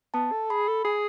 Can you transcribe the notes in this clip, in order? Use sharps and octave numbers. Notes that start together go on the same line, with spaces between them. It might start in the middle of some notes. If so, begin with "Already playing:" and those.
B3 A5
A4
G#4 B5
A4
G#4 G#5